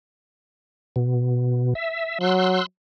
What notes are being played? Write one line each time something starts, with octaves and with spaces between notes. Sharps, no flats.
B2
E5
F#3 C6 E6 F#6